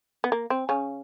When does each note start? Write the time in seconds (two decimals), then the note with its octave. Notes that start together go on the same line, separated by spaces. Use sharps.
0.24 B3
0.32 A#3
0.50 C4
0.69 C#3 C#4